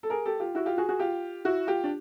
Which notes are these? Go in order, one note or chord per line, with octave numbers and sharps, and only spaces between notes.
A4
G#4 A#4
G4 A4
F4 G4
E4 F#4
F4 G4
F#4 G#4
F#4 G#4
F4 G4
E4 F#4
F4 G4
D4